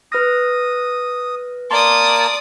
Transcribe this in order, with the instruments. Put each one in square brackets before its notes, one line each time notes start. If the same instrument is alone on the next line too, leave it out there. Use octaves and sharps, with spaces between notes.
[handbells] B4 F6 A#6 [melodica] D#6
[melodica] A#3 A5 [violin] D5 D#6 [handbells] C6